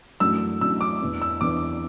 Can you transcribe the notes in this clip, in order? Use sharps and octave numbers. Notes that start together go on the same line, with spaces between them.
F#2 E3 A3 D4 F#4 E6
F#2 E3 A3 D4 F#4 E6
D6
E2 E3 D4 B4
E6
E2 E3 D4 B4 D6